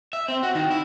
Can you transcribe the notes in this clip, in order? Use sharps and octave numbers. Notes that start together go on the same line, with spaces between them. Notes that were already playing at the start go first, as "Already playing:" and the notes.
E5
C4
F#4
D#3
E4